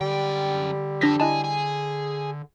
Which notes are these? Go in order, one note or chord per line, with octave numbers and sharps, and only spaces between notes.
F#2 D3 G3 G5
F3 D4 A4 A#6 B6
E4 G#4 D#5 A5
G#4